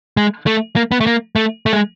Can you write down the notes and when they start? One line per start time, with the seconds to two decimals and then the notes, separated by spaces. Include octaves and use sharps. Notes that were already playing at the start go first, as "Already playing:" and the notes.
0.17 G#3
0.46 A3
0.76 A#3
0.92 B3
1.01 A3
1.06 A#3
1.36 A3
1.66 A3
1.73 G#3